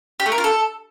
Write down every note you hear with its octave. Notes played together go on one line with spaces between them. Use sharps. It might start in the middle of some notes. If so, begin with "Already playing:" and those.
G4
A3
A#4
F4
A4